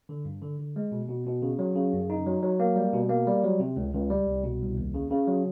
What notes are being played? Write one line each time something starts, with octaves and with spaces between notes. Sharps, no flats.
D3
G2
D3
D3
G#3
B2
B2
B2
C#3
F#3
C#3
F#2
D#4
F#3
F#3
A#3
G3
B2
A#3
G3
F#3
C3
C#2
C#2
G3
C2
B2
C2
D#2
C#3
C#3
F#3